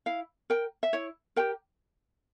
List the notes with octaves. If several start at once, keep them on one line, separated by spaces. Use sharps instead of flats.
E4 F5
A#4 G5
E5
E4 C#5
G4 A#4 G5